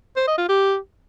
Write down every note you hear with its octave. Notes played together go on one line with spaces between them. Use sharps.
C5
D#5
F4
G4